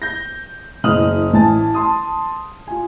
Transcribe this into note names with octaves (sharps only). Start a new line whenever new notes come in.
G6 A#6
F#1 E3 D#5 D#6 F6 F#7
A1 E3 G#5 A5 A6
A5 C6 D#6
F4 G#5